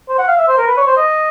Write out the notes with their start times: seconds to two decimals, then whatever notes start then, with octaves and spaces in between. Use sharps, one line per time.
0.09 C5
0.19 F#5
0.28 F5
0.38 E5
0.48 C5
0.58 A#4
0.67 B4
0.77 C#5
0.87 C5
0.97 D#5